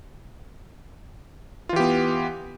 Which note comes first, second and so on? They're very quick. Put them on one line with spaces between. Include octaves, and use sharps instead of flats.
F4 E3 G4 B3